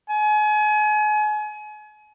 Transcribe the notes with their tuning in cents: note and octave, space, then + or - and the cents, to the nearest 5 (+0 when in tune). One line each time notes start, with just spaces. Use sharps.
G#5 +35